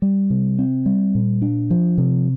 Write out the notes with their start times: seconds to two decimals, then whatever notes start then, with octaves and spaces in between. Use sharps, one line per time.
0.02 G3
0.30 C3
0.59 C4
0.86 G3
1.15 A#2
1.42 D4
1.70 F3
1.98 C3